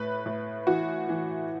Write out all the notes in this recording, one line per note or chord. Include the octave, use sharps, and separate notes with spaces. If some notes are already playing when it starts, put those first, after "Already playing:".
Already playing: A2 B4
A2
E3 F#4
E3